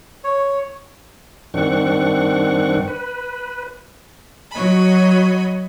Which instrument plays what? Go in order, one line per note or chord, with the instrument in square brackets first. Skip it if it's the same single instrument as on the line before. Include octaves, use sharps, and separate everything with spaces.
[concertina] C#5
[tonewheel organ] G2 D#3 C4 D4 F#5 C#6
B4
[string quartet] F#3 F#4 C#5 D#5 B5